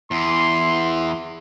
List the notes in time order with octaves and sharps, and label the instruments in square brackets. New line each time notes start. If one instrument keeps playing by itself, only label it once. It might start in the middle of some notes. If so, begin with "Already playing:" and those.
[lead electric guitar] E2 [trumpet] C6